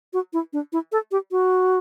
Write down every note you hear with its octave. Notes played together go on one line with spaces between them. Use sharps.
F#4
E4
D4
E4
A4
G4
F#4